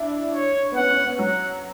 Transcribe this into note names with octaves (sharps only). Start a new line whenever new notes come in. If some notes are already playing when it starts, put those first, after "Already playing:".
Already playing: D4 E4
C#5
B3
C#4 F#5
C#4
B3
F#3 F#5